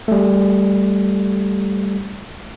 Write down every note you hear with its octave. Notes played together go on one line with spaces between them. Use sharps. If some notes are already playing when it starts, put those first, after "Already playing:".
G3 A3